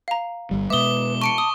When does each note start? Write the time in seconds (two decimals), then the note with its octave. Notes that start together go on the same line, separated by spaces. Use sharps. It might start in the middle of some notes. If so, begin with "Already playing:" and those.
0.08 F5 A#5
0.51 G1 G3
0.70 B2 G#3 B4 E5 D6 D#6 G7
1.22 A5 C#6 C#7 D7 G7
1.38 D#6